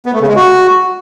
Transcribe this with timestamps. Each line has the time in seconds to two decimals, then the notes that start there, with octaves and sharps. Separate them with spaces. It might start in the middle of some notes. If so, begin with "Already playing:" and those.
0.06 B3
0.13 A3
0.21 C#3
0.28 G#3
0.36 F#4